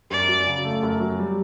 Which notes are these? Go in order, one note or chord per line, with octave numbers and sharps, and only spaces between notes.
F#2 D5
F#3
C#3
A3
F#2
F#3
G3